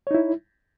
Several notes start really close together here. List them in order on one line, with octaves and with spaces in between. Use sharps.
C#5 D#4 E4